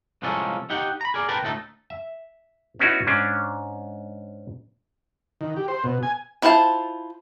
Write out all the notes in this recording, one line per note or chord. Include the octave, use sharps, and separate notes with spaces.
C2 F3 G#3 A#3 C#4 A4
D#4 G4 F#5 G5
A#5 B5
G#4 A#4 D5
A#4 B4 G5 A5
D2 A2 A3 D#4 A4
E5
B3 C#4 D#4 E4 F#4
G#2 C#4 D4
D#3
G4
C5
B2
G#5
D4 E4 F4 C5 A5